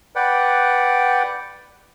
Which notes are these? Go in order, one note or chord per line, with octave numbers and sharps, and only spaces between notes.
B4 D5 F#5 G5